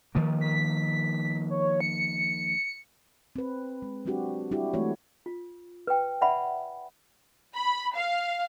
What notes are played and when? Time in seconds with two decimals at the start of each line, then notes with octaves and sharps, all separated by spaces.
0.15 D#3 F3 A#3
0.41 B6
1.50 C#5
1.80 C#7
3.36 C4 B4
3.82 G#3
4.05 F#3 G#3 C4 D4 F#4 G4
4.51 G3 D4 E4 F#4 G4
4.74 E3 G#3 A3 C4 F#4 C#5
5.26 F4
5.87 B4 G5
6.21 B4 D5 E5 F#5 G#5 B5
7.54 B5
7.95 F5